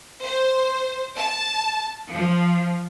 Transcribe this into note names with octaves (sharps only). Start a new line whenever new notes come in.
C5
A5
F3